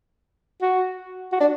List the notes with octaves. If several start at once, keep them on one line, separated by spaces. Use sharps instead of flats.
F#4
F#4
D4